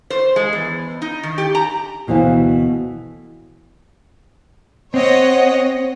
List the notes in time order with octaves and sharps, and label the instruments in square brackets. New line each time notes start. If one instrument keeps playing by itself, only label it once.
[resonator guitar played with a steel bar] C5
G#3
E2
D#4
D#3
G4
A#5
[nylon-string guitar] D2 B2 E3 C5 F5
[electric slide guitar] C4 [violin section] C#5 D#5 F#5